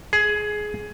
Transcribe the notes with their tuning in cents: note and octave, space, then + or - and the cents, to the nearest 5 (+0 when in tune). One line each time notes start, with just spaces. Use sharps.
G#4 +15